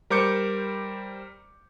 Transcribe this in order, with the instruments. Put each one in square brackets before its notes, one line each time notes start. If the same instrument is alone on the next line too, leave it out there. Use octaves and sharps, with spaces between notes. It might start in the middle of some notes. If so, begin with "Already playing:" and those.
[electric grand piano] G3 A#4 C5 D6 G6 C#7